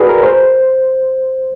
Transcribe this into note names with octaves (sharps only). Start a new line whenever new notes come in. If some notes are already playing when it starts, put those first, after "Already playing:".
Already playing: F#4 G#4 B4 D5
A#4
C5